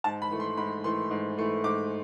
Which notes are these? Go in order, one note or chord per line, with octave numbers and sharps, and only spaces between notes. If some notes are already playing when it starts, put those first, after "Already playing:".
G#2 A5
B5
E3 A3
C6
G#2 B5
E3 A3 C6
G#2
E3 A3
G#2 D6